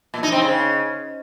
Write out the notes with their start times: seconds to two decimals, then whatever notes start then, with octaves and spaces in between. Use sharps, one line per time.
0.14 A#2
0.23 D#4
0.32 C4
0.42 C#3